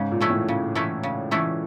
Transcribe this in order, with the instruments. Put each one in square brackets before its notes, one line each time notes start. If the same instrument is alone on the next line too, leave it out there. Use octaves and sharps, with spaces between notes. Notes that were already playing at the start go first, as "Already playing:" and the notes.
Already playing: [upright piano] G#2 [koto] C#3
[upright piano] A#2
[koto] E3 A3 C#4 E4
[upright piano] A2
[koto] C#3
E3 A3 C#4 E4
C#3
E3 A3 C#4 E4